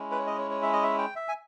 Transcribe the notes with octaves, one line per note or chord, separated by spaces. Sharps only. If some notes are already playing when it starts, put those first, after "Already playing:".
Already playing: G#3 C#4 E4
B4
C#5
D#5
C#5
C#5
E5
D#5
E5
G5
E5
G#5